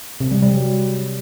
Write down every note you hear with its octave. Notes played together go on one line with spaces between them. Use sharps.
C3
G3
G3
F#3